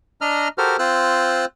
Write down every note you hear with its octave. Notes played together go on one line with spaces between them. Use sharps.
D4 D#5 A#5 F6
F#4 G4 A4 A#4 C5 F6
C4 F4 C5 E6 F#6